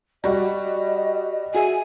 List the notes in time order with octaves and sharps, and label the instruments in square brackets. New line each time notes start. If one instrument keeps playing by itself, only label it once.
[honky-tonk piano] G3 F#4 [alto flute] D#5
[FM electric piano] F#4 G#4 E5 [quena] G#5